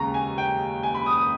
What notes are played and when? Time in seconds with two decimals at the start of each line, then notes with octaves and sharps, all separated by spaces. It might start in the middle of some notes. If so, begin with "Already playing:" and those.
Already playing: D#2 C#3 G#3 A#5 C#6
0.14 G#5
0.38 G5
0.83 G#5
0.95 B5
1.06 D#6
1.17 D#6